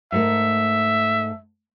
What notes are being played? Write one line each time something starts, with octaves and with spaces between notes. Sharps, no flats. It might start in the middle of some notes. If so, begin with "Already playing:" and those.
G#2 A3 A#4 E5